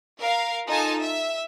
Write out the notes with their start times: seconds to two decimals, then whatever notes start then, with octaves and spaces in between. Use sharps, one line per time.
0.18 A#4 F5
0.68 D#4 F4 A4 G#5 A5
1.02 E5